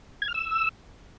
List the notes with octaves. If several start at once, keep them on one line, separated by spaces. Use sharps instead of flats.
G#6
F6
E6